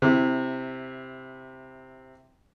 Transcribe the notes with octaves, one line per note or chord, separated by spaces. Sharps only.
C3 E4